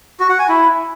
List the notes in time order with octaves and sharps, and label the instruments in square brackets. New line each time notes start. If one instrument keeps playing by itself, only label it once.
[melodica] F#4
F#5
G#5
E4